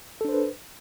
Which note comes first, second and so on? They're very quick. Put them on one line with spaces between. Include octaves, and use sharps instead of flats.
A4 D4 C5 B4